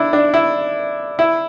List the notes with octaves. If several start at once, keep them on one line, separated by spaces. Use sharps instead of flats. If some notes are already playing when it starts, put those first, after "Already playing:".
Already playing: D4 E4
D4
E4
E4